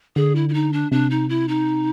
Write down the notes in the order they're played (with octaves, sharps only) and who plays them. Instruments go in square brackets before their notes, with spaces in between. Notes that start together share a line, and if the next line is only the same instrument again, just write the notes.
[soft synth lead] D3 [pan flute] G#4
[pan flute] E4
E4
D#4
D4
[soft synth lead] C3 [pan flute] D4
[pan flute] D#4
E4
D#4